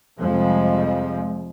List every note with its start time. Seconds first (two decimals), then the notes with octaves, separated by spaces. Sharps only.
0.20 F2 C3 F3 G3 G#3